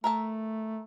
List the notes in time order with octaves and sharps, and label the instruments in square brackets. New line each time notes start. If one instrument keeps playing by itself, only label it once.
[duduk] A3 [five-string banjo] A#4 E5 A5